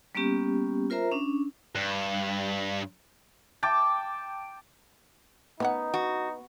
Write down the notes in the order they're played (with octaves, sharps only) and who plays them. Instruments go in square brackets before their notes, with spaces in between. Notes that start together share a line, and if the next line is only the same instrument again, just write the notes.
[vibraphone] G3 A#3 B3 C#4 G4
F4 A#4 C5 E5 A#5
C#4 D4
[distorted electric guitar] G2
[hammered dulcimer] G5 A5 D6
[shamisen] D#3 C#4 F#5 [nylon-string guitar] B3 [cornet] D#4
[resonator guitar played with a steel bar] F#4